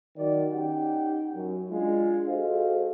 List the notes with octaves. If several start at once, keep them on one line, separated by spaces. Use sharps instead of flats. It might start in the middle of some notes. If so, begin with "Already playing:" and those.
D#3 F#3 D5
C#4 D#4 G4 F#5 G5
F#2
G#3 D4 F4
F#4 G#4 A4 C5 D#5 F5